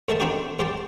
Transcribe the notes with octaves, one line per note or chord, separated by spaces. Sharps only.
G#2 A3 A4 D#5 E5 A5
B3 C4 D4 D#4 F#4 G4
G#2 G4 C5 G5 A5